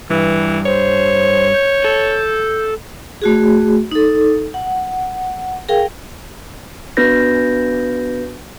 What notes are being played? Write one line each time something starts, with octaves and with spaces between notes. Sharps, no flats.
G2 E3
C5 C#5
G6
A4
A3 F#4 G#4
D#4 A4
F#5
G#4 A#4 F5 G5
B3 D4 F#4 B4 G6 A#6